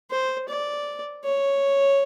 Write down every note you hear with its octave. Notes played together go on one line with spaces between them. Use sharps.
C5
D5
C#5